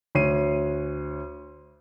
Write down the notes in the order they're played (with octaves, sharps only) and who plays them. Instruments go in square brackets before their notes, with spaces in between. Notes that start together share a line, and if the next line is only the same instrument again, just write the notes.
[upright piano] D2 C#5 C7 D#7